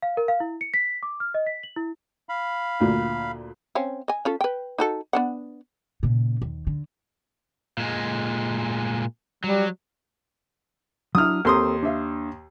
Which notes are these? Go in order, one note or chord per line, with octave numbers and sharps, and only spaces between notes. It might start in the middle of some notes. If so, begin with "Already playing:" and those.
F5
A#4
F5
E4
C#7
B6
D6
F6
D#5
B6
F#7
E4
F5 B5
D2 A#2
C4 C#4 F5
D#5 G#5
C#4 F4 A4
B4 G5
D#4 F#4 A4
B3 D4 F#5
A#2 C#3
D#2
D3
A#2 G#3
F#3 G3
F#3 D4 E4 D#6 F6
D#2 C4 A4 A#4 C6 D#6
D4 E5 F5